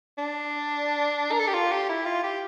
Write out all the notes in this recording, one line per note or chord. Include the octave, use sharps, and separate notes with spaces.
D4
A#4
A4
G4
F4
G4
E4
F4
G4